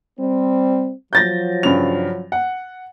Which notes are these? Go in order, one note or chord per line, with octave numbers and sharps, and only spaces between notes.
G3 C4
F3 F#3 G6 A6 A#6
G2 C#3 F7
F#5